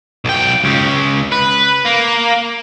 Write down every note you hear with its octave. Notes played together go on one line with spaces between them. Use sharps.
B1 G5
C#2 C#3
B4
A#3